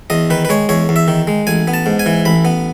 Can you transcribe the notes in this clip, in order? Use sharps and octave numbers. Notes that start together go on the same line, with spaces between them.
E2 D#5
D#3 B4
B4
G#3 C#5
E2 C#5
E2
E5
D#3
G#3
A1 G#5
B3
A5
G#2
G#5
E3
A1 B5
B3